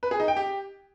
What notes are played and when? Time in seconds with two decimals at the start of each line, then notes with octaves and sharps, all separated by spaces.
0.03 B4
0.11 G#4
0.20 D#4
0.28 G5
0.37 G4